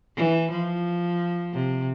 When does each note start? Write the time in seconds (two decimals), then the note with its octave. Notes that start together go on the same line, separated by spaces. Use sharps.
0.16 E3
0.51 F3
1.54 C3